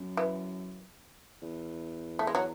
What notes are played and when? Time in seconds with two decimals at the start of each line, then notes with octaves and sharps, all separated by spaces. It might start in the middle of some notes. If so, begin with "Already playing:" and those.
Already playing: F#2
0.17 E3
1.42 E2
2.19 A3
2.27 G#3
2.35 F#3